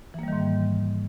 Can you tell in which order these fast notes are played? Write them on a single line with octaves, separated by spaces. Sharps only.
E3 A#3 G3 D#3 G#2